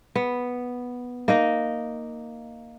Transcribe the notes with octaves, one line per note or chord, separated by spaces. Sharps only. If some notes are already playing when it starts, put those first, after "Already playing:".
B3
A#3 D#4 D#5